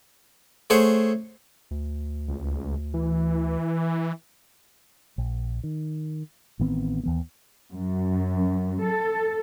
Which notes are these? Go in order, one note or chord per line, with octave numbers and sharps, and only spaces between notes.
A3 G#4 C5 C#5 F#5
D2
C#2
E3
A#1
D#3
A1 D#3 B3 C4
D#2 E3 B3
F#2
A4